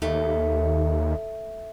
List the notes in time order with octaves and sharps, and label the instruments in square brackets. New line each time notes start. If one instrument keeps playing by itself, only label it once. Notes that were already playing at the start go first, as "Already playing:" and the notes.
[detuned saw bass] D#2 [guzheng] A3